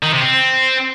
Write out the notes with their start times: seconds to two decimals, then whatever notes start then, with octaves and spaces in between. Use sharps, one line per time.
0.03 D#3
0.12 C3
0.21 C4